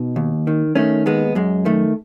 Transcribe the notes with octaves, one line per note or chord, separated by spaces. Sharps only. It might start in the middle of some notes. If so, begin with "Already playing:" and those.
Already playing: B2 D#4
D#2
D#3
D#3 A3 C#4
D#2 G#3 B3
F#2 G#3
D#3 A3